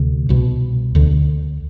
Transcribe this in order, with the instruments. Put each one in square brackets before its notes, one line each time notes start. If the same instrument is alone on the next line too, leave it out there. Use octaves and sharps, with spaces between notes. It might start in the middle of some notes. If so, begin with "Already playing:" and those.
Already playing: [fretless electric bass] D2 C3
C2 B2
D2 D3